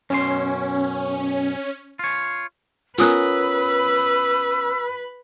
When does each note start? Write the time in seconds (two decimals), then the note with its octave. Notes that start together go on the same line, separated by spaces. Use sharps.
0.10 F#2 B2 C#4 C6
1.99 F4 C#5
2.98 B3 C#4 F4 A#4 B4 D#6 E6 F#6